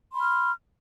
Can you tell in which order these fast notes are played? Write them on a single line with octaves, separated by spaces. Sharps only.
C6 B5 F6